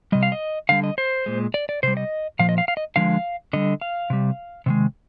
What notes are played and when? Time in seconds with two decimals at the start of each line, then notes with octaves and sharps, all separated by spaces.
0.12 C3 G3 D#5
0.23 F5
0.32 D#5
0.69 D3 G3 F5
0.84 D#5
0.98 C5
1.26 A#2 G#3
1.54 D5
1.69 D5
1.83 C3 G3 C5
1.97 D#5
2.39 A#2 F3 F5
2.49 D#5
2.58 F5
2.68 F5
2.77 D#5
2.96 D3 F3 G#3 F5
3.53 D3 G3 D#5
3.81 F5
4.10 C3 G3
4.66 C3 D#3 G#3